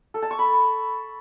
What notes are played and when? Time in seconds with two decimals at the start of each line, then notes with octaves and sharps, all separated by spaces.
0.14 A4
0.22 A5
0.31 C#6
0.39 B5